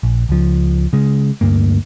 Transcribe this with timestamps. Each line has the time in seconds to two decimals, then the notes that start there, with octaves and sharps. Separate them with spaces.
0.03 A#1
0.29 C#2 F3
0.93 C#3 G#3
1.41 D2 G2 A#3